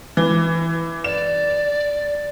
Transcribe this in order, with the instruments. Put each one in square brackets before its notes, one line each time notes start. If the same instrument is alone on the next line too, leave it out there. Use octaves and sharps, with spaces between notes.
[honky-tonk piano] E3
[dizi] D5 [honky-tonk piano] E7